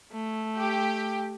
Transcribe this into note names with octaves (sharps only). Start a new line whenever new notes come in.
A3
G4